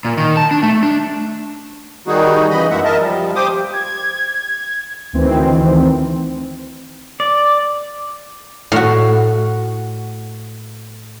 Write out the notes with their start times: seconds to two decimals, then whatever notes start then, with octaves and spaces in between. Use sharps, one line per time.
0.05 A#2
0.17 D#3
0.37 A5
0.51 D4
0.63 A3
0.83 D4
2.07 D#3 G3 D#4 F#4 G#4
2.50 C#3 E3 D#5 B5
2.70 F#2 G#3 A#3 E5 F#5
2.85 A#4 D#5 E5 A5
3.00 F3 G3
3.35 G4 C5 G5 D6 D#6
3.73 G#6
5.13 D2 D#3 E3 C4
7.20 D5
8.72 A2 F#4